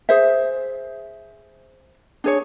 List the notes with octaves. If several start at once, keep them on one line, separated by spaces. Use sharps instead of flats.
G#4 C5 E5
D4 G#4 C#5